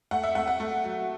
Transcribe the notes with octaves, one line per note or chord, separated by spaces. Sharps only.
A3 F#5
E5
A3 F#5
F#5
A3
F#3